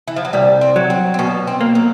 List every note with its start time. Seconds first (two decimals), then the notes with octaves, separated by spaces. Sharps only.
0.08 E3
0.16 F3
0.25 F#3
0.33 C2 G3
0.61 C4
0.76 F#3
0.90 C4
1.14 C4
1.19 B2 C#4
1.47 C4
1.61 A#3
1.75 F#3